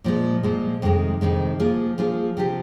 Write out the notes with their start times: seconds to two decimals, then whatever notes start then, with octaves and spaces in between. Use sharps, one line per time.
0.04 A#2 F3 G#3
0.43 A#2 F3 G#3
0.82 F2 C3 D#3 G#3
1.21 F2 C3 D#3 G#3
1.60 F3 A#3 F4 G#4
1.98 F3 A#3 F4 G#4
2.37 C3 F3 C4 G4